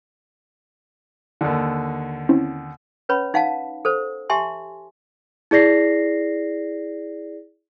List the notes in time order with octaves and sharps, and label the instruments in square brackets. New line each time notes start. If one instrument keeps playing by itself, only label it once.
[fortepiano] D#2 D3
[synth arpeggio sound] C4 C#4 E4
[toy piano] C#4 B4 C#5 B5
D#4 F5 F#5 A5
A4 C5
G4 E5 G#5 A5 C6
[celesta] E4 G#4 D5 A#6 C7